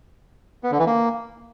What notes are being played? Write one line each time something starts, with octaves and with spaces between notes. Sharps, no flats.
B3
D3
E3
A#3